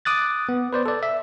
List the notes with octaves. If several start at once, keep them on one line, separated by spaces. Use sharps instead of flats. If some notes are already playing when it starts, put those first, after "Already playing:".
D6 D#6 F#6 A6
B3
B4 C5 D5
A4 D5
E5